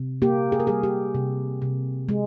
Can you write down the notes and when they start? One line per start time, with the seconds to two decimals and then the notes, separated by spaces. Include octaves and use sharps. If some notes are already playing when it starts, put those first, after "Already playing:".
Already playing: C3
0.22 A#3 G4
0.52 G#4
0.60 A#4
0.67 G3 G#4
0.83 G4
1.15 C3
1.62 C3
2.09 G#3